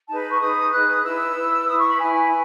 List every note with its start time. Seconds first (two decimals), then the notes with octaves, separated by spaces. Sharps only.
0.08 D#4 G#4 B4 A5
0.19 B5
0.30 C#6
0.40 D#4 G#4 B4 D#6
0.72 D#4 G#4 B4 F#6
0.88 D#6
1.03 E4 B4 E6
1.35 E4 B4
1.68 E4 B4 D#6
1.78 C#6
1.89 B5
1.99 E4 B4 G#5